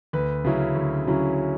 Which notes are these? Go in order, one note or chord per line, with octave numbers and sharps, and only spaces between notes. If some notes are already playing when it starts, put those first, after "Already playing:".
D2 B4
C#3 F#3 C#4 E4
D2
C#3 F#3 C#4 E4